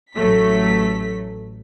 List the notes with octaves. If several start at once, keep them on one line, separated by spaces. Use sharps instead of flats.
A1 F#3 A3 B6